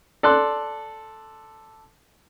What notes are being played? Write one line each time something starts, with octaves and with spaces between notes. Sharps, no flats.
A4 D5 C6 F#6